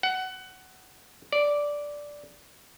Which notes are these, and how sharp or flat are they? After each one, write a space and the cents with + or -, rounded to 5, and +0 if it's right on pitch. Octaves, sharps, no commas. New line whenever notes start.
F#5 +20
D5 -5